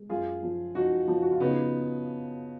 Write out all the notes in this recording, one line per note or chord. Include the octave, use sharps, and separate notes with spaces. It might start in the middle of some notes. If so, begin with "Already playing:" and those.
Already playing: G#3
F#2 F4 G#4
F3
F3 D#4 F#4
F3
F#4
F4
C#3 B3 D#4